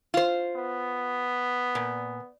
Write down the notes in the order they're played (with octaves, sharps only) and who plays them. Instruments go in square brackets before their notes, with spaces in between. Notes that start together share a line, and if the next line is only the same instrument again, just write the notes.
[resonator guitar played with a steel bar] F4 C5
[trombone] B3
[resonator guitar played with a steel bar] A#2